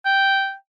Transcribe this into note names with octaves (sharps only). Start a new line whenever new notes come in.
G5